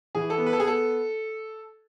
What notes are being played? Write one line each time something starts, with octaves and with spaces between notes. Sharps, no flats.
E3 G#4
A4
B3
B4
A4
B3 G#4
A4